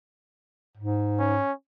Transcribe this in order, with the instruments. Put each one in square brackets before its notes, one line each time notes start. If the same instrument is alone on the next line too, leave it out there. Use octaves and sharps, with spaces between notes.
[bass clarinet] G#2
[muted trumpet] C#4